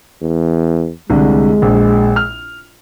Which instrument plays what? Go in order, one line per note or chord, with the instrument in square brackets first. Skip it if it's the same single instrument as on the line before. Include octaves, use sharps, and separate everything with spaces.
[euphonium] E2
[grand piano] C2 D3 [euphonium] G#3
[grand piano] A#1
F6